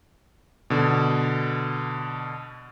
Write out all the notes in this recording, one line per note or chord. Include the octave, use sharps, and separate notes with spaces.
B2 D3